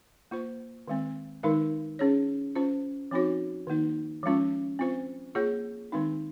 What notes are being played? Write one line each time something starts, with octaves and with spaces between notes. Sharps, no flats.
A#3 F4 C5
D#3 G#3 C4
D#3 G#3 D#4 A#4
C#4 G#4 C#5
C#4 F4 C5
F3 C4 D#4 F#4 C#5
D#3 A#3 D#4
F3 G#3 C#4 F4
C4 F4 C5
A#3 F4 G#4 C#5
D#3 G#3 C4 D#4